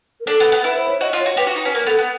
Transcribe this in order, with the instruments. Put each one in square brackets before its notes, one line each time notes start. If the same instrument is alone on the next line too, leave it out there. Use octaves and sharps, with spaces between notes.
[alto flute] A#4
[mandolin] D4 [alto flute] A4
[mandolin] B3
B3
[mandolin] E4 [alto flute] B4
[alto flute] C5
C#5
[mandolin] F#4 [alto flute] D#5
[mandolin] F4
[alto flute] C#5
[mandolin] F#4
[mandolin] G4 [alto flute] B4
[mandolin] F#4
D#4
C#4
[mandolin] A#3 [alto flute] A#4
[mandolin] B3 [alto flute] A4
[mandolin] B3